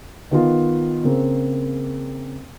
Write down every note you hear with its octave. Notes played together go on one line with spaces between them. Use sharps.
D#3 B3 F4
C#3 A#3 C4